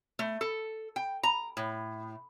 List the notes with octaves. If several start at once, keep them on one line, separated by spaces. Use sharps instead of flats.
A3
A4
G5
A#5
A2